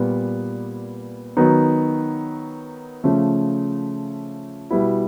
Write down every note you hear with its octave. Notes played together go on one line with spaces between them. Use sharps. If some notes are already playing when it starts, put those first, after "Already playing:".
Already playing: A#2 G3 B3
D#3 F#3 B3 D#4
C#3 F3 A3
B2 G3 B3 E4